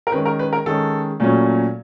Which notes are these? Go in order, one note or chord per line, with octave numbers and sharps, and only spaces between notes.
A#4
D#3 G#3 C#4 B4
A#4
B4
A#4
D#3 G#3 C#4 A4
A#2 F#3 A3 C#4